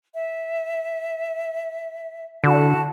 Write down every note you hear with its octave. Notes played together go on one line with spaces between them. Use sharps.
E5
D3 E4 F#4 A5